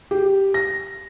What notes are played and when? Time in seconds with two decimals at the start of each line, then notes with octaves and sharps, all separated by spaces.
0.11 G4
0.54 A#6